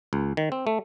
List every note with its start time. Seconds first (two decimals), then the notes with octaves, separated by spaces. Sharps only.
0.13 C#2
0.37 D#3
0.52 C4
0.67 A3